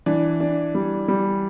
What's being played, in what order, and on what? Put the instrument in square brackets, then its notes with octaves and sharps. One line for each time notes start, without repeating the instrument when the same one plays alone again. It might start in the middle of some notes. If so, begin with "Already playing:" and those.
[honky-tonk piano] E3 [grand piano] D4
[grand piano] D4
G3
G3